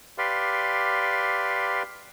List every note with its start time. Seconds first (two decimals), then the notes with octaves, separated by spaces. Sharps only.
0.18 G4 B4 D5 F5 C6